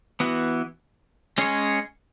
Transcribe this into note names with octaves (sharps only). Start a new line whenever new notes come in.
E3 B3 F#4
G#3 C#4 G#4 C#5